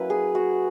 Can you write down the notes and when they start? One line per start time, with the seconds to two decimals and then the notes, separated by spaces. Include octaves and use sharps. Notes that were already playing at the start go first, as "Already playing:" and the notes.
Already playing: F#3 A#3 C#4 E4 B4
0.10 G#4
0.35 F#4